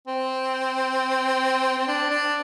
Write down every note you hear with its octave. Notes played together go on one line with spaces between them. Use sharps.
C4
C4
D4
D4